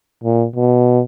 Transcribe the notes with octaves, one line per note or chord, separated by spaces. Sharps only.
A#2
B2